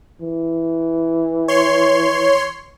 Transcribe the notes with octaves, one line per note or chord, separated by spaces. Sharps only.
E3
C#5 C6